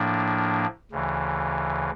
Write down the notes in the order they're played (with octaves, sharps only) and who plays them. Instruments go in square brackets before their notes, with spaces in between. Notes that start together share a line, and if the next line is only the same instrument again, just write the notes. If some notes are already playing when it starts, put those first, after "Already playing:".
Already playing: [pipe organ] A2 F3 A#3 D4
D2 C#3 E3